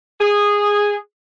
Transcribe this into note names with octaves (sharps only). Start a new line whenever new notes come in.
G#4